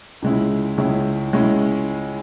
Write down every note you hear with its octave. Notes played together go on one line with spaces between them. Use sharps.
C#2 C#3 G#3 C#4 E4
C#2 C#3 G#3 C#4 E4
C#3 G#3 C#4 E4